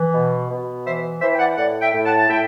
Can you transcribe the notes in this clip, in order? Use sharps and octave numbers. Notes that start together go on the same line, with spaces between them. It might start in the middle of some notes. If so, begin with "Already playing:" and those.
Already playing: E3
B2
B2
E3 C5 E5
E3 C5 E5
G5
D5 F#5
A2 D5 F#5
E5 G5
A2
F#5 A5
A5
A2 E5 G5